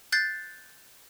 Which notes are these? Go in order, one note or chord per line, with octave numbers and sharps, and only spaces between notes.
F#6 G6 A6 C7